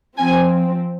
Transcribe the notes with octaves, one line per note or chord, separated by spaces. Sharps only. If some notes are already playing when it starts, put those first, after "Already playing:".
F3 C4 G#5